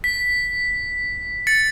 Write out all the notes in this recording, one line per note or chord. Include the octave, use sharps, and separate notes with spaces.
B6
A6 C#7